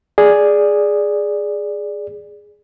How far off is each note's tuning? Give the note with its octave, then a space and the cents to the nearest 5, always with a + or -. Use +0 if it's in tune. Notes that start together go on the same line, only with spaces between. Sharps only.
G#4 +0 D5 +0